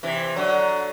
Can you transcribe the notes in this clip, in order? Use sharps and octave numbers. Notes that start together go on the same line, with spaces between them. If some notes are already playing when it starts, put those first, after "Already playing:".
C3 E3
D3 F#3